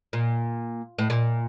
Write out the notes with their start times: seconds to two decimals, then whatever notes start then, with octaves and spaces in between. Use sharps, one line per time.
0.13 A#2
0.98 A2
1.10 A#2